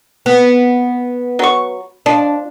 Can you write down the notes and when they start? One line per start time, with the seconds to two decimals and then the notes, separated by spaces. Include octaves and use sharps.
0.26 B3
1.39 F#3 C#6
2.06 F3 D4